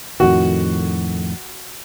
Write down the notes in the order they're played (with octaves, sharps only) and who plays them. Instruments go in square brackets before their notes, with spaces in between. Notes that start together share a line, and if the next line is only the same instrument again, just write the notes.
[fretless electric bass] F2 A2 D#3 [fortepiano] F#4